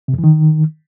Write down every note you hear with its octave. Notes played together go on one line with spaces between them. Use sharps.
C3
F2
E3
D#3